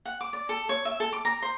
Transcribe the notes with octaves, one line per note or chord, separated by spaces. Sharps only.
F#5
D6
D5
A4
C#5
E5
A4
D6
A#5
C5